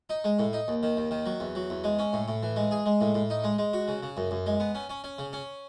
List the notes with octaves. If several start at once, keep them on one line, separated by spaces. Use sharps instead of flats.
D#4
G#3
A2
D#4
D#2
D#3
D#2
D#3
F#3
E2
F#3
E2
G#3
C#4
A2
A2
E3
G#3
G#4
G#3
A2
A2
D#4
G#3
G#3
F#4
C#3
C#3
F#2
F#2
G#3
B3
C#4
C#4
C#4
C#3
C#4